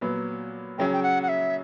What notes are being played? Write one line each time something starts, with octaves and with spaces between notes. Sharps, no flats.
A#2 F#3 B3
C#3 F#3 C#4 G5
G5
F#5
F#5
E5